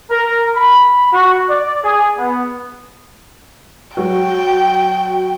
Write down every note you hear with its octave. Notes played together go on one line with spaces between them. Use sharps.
A#4
B5
F#4
D5
G#4
B3
F#3 F#4 G5